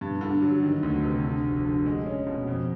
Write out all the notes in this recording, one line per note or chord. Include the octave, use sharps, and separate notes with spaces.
G2
D3
F#3
D#3
D2
C3
D3
F1
D3
G#3
C#4
B2
F2